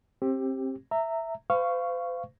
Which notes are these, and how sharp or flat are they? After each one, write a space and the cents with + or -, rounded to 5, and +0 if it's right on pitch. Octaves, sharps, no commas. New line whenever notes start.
C4 +25 G4 +0
E5 +0 A#5 -25
C5 -45 F5 -15 C#6 +0